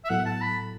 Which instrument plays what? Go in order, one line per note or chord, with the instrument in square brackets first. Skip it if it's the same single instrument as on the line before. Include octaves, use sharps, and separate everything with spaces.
[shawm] E5
[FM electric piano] A2 F#3 B3 E4 A4 [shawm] F#5
[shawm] A5
B5